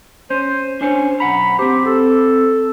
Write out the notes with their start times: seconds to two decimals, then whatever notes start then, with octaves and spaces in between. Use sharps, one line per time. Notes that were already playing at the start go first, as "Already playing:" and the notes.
0.30 C#4 C5
0.81 C#4 D4 C5 C#5
1.20 B1 F#5 A#5 B5
1.59 C4 G4 C5
1.86 A4